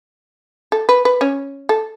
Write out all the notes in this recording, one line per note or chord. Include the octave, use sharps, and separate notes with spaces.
A4
B4
B4
C#4
A4